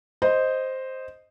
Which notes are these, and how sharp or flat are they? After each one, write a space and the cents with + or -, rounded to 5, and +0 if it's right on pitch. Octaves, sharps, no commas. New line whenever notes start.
C5 +0 D#5 +0